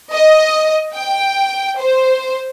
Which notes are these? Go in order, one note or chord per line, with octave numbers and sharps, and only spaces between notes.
D#5
G5
C5